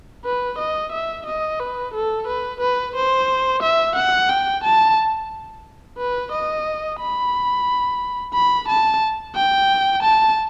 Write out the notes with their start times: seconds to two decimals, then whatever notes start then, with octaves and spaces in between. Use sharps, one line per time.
0.25 B4
0.59 D#5
0.92 E5
1.27 D#5
1.60 B4
1.94 A4
2.27 B4
2.60 B4
2.95 C5
3.63 E5
3.96 F#5
4.29 G5
4.64 A5
5.98 B4
6.32 D#5
7.00 B5
8.33 B5
8.68 A5
9.35 G5
10.03 A5